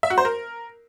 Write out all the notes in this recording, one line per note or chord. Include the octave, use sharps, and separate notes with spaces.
E5
F#4
C5
A#4